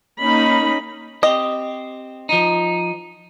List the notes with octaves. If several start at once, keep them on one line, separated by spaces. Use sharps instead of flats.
A#3 C#4 D#4 B5
C4 G4 D#5
F3 D#4